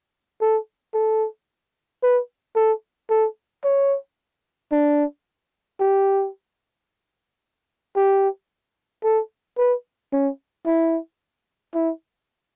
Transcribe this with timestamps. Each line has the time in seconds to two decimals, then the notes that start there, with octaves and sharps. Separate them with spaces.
0.41 A4
0.94 A4
2.03 B4
2.56 A4
3.10 A4
3.64 C#5
4.72 D4
5.80 G4
7.96 G4
9.04 A4
9.58 B4
10.13 C#4
10.66 E4
11.74 E4